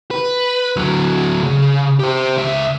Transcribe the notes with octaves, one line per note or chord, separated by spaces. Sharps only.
B4
D2 F#3
C#3
G4 C5
C#2 E5